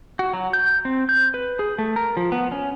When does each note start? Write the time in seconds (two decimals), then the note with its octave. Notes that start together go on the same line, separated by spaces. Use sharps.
0.19 F#4
0.34 F#3
0.53 G6
0.85 C4
1.09 G6
1.34 B4
1.59 G#4
1.79 A3
1.96 A#4
2.17 F3
2.32 B3
2.52 C#4